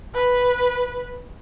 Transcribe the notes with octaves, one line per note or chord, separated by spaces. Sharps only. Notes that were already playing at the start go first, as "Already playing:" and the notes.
B4